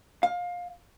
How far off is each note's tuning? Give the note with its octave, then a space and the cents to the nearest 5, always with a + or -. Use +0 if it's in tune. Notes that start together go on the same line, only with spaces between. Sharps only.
F5 +20